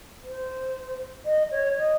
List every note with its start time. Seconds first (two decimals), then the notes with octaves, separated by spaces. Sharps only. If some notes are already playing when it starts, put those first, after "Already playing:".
0.23 C5
1.25 D#5
1.51 C#5
1.77 D#5